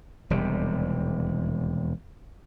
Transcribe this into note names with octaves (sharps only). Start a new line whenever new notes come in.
E1 D#2 C3 G3